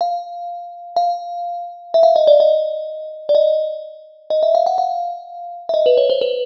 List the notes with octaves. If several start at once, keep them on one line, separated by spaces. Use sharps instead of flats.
F5
F5
E5
F5
D#5
D5
D#5
D5
D#5
D#5
E5
F5
F#5
F5
E5
D#5
B4
C#5
C5
B4